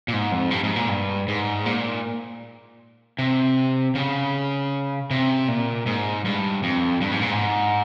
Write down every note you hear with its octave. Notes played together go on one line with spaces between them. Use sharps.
A#2
G#2
F2
G2
G#2
A#2
G2
G#2
A#2
C3
C#3
C3
A#2
G#2
G2
F2
G2
G#2
A#2
G#2